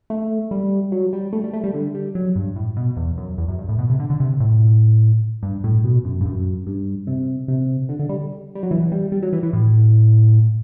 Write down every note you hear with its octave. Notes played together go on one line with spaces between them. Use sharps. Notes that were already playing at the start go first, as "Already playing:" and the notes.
A3
G3
F#3
G3
A3
G3
A3
G3
D3
G3
F#3
G2
A2
B2
E2
F#2
E2
F#2
G2
A2
B2
C3
D3
D3
C3
A2
G2
A2
B2
F#2
G2
F#2
G2
C3
C3
D3
D3
G3
G3
F#3
E3
G3
G3
F#3
E3
E3
A2